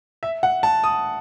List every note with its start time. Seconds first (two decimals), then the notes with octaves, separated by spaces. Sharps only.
0.23 E5
0.43 F#5
0.63 A5
0.84 D#6